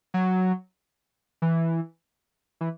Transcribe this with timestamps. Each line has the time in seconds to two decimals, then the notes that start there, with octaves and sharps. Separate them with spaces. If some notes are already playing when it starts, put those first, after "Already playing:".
0.14 F#3
1.42 E3
2.61 E3